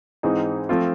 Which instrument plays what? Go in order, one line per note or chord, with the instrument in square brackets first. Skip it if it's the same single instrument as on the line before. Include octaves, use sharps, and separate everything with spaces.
[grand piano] G#2 E3 G#3 C4 D#4
F3 A3 C4 F4